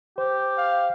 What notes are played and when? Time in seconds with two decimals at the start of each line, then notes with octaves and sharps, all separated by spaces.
0.18 G4 C5
0.58 F5